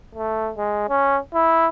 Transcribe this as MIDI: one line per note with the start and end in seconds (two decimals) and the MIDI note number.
0.15 0.52 57
0.57 0.86 56
0.89 1.18 61
1.34 1.68 64